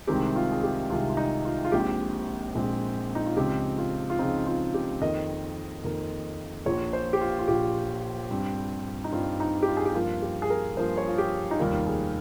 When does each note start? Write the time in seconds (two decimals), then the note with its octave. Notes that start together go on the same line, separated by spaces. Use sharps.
0.07 C2 C3 D#3 G#3 C4 G4
0.36 F4
0.52 G#4
0.63 G4
0.90 C2 C3 D#3 G#3 C4 F4
1.10 F4
1.17 D#4
1.45 F4
1.65 F4
1.72 A#1 A#2 G#3 C4 G4
2.55 A#1 A#2 G#3 C4
3.15 D#4
3.26 F4
3.37 C#2 C#3 F3 C4 G4
3.78 F4
4.10 F4
4.19 C#2 C#3 F3 C4 D#4
4.47 F4
4.74 G4
5.01 F2 D#3 A#3 D#5
5.84 F2 D#3 A#3
6.66 A#1 A#2 F3 C#5
6.93 C5
7.13 G4
7.21 F4
7.39 F4
7.48 A#1 A#2 F3 G4
8.31 G2 G3 C4
9.04 D#4
9.12 G2 G3 C4 F4
9.40 D#4
9.62 G4
9.68 F4
9.77 G#4
9.85 G4
9.95 G2 F3 A#3 F4
10.22 G4
10.42 G#4
10.50 A#4
10.77 G2 F3 A#3 C5
10.98 C#5
11.08 F4
11.18 G4
11.51 D#4
11.59 F1 D#2 D#3 G3 A#3 F4
11.87 G#4